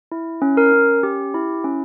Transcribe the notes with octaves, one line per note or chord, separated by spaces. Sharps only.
E4
C#4
A#4
C#4
G4
E4
C#4